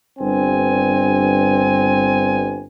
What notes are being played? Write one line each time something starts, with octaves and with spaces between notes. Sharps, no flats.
G1 G2 C4 G#5